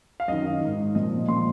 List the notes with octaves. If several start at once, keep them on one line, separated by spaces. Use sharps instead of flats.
F5
F#2 D#3 D#5
G#2 D#3
A#2 F3 D#5
A#2 F3 C6